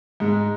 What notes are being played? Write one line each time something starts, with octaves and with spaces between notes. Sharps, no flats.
G#2 G#3